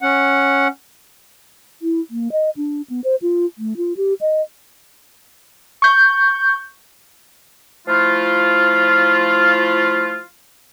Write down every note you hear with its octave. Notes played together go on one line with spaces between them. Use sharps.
C#4 F#5
E4
A#3
D#5
D4
B3
C5
F4
A3
F4
G4
D#5
C#6 G6
F3 A3 E4 F4